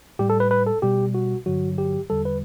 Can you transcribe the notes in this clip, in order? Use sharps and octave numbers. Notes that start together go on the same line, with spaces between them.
A2 G3 G4
A4
B4
B4
A4
B2 G3 G4
F#4
G2 D3 F#3 F#4
G4
E2 D3 G3 A4
B4